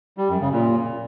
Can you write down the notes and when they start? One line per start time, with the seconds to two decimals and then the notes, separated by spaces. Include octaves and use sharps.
0.18 G3
0.29 F#2
0.41 C#3
0.52 A#2